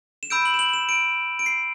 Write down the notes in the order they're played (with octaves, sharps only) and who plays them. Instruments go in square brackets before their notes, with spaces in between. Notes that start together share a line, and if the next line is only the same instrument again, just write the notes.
[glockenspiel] E7
B5 E6 G6 D7
F#7
E7
F#7
E7
D7
D7
C7